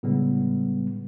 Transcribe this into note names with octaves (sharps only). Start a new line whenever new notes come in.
A2 C#3 G3 G#3 B3